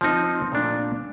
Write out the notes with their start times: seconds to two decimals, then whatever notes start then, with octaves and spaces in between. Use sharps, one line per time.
0.01 F3 C4 D#4
0.52 A#2 A3 D4